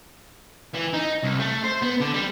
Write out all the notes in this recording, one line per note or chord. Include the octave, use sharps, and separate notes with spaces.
E3
D#4
C2
A3
C5
B3
D3
G3